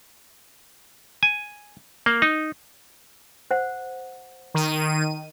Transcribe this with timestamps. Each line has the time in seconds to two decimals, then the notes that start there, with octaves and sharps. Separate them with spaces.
1.23 G#5
2.06 A#3
2.22 D#4
3.51 C5 F#5
4.55 D#3 D#7